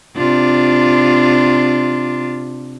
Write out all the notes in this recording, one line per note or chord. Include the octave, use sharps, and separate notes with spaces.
C3 D4 F4